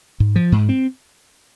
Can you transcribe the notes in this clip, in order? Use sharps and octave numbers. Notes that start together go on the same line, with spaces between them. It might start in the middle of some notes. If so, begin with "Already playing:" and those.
G#2
F3
G#2
C4